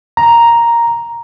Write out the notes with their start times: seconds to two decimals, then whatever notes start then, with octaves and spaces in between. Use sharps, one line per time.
0.17 A#5